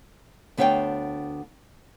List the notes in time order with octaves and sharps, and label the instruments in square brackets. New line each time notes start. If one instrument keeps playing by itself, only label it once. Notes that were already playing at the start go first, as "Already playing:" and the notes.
[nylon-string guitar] D2 B3 D4 C#5 F5 G5